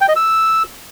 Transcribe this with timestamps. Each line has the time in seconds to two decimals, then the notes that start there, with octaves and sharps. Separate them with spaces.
0.01 G5
0.08 D#5
0.16 E6